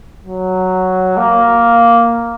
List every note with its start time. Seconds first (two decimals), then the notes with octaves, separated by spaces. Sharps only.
0.24 F#3
1.17 A#3